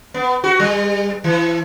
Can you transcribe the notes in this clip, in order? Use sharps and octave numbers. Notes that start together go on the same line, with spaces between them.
B3
F#4
G3
E3